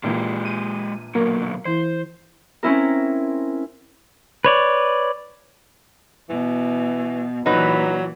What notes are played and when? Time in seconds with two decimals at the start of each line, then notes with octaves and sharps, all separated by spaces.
0.03 A#1 A#2 E3 G#3 G4
0.45 D#7
1.15 B2 D3 F#3 A#3 A#4
1.65 E3 E4 C5
2.63 C4 C#4 E4 A#4
4.45 B4 C#5 D5
6.29 B2 E3
7.46 A#2 E3 F#3 D#4 B4